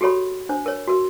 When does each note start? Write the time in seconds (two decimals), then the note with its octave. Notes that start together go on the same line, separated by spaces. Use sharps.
0.01 F#4 G4 A4 C#5 B5
0.49 D4 C5
0.66 A#4 C#5
0.88 F#4 A#4